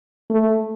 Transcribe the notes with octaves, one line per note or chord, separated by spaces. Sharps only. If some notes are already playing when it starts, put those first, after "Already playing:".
A3